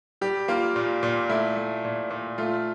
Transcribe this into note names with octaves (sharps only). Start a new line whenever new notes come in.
G3 G4
A#3 F4
A#2
A#2
A3 E4
A3
A#2
A#2
A3 F4